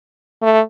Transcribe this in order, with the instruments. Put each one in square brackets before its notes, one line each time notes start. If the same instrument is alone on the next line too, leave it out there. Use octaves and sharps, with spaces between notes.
[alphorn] A3